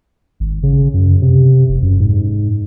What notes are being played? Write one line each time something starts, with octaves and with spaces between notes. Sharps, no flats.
G#1
C#3
F#2
C3
F1
F#2
G#2